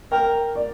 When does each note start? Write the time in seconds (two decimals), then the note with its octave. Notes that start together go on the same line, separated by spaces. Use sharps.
0.11 A#4 G5
0.55 D5